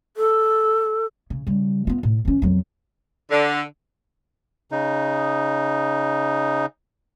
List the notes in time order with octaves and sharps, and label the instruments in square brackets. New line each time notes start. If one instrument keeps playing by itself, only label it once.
[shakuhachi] A4
[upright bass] C#3
C#3 G3
B3 F4
A2
E3 C#4
F2 F#3
[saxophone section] D3
[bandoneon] C#3 D#4